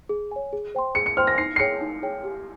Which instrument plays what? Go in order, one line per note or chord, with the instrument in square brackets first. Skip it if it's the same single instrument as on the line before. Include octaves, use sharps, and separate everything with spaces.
[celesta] G#4
C#5 G#5
G#4
C5 G5 C6
[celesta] G#4 [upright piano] C#7
[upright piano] C#7
[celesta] C5 G5 C6 [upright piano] F6
[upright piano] A#6
[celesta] D#4 [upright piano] C7
[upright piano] C7
[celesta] G#4 C#5 G5 [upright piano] C#7
[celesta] D#4
G#4 C#5 G5
G4